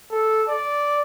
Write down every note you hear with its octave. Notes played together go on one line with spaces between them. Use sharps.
A4
D5